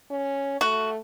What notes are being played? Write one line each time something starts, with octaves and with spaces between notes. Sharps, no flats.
C#4
A3 F#4